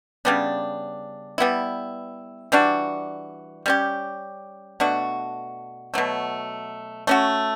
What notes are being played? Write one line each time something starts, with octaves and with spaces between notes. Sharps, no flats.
C#3 G3 B3 D4
G3 B3 E4
E3 G3 D4 F#4
G3 C#4 G4
B2 A3 D4 F#4
B2 F#3 A3
A3 C#4 F#4